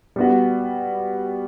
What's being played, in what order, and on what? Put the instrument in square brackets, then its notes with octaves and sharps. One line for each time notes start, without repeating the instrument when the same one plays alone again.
[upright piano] G3 B3 F#4